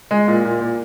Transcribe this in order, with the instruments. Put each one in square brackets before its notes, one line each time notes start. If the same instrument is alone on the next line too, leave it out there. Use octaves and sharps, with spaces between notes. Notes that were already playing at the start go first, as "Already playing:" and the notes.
[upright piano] G#3
A#2
A#2
A#2